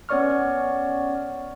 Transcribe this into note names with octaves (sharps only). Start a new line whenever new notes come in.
B3 C#4 C#5 D5 C#6 F6